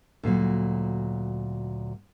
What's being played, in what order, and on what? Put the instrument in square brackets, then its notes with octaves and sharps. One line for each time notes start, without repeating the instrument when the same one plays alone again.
[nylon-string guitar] D2 A#2 D3 F#3